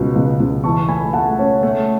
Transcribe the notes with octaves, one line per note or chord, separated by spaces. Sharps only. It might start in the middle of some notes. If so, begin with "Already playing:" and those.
Already playing: C#2 B2
C#2
C#2
E3 A5 C#6
A3 G#5 B5
A3 F#5 A5
C#4
A3